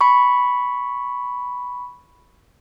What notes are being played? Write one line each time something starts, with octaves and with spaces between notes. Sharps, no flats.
B5 C#6